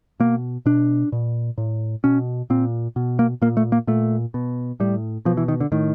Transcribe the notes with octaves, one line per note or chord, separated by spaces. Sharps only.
B2 A#3
B2 D4
A#2
A2
B2 C#4
A#2 C4
B2
A#3
A#2 A#3
A3
A#3
A#2 A3
B2
A2 G3
B2 F3
E3
D#3
D3
A2 D#3